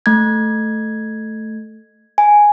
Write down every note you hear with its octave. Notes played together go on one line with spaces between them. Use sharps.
A3 G#6
G#5